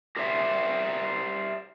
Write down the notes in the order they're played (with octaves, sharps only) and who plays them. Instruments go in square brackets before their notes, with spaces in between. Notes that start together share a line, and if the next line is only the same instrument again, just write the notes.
[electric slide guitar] G4 A#4 C5 D5 E5